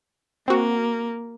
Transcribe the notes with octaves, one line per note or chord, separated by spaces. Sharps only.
A#3 C4 F#4